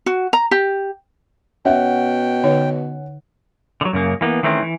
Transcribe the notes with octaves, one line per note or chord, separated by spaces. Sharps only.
F#4
A#5
G4
B2 C#4 E5 F#5 G5
D3 D#4 C#5
D3 F#3
F#2 C#3 A#3
E3 A#3 B3
D#3 E3 A3 C4 C#4
E3